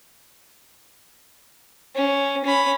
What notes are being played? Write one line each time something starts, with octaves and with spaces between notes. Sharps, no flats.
C#4
C#4 B5